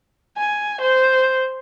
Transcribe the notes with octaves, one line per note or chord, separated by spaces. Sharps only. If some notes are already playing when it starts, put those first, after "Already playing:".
G#5
C5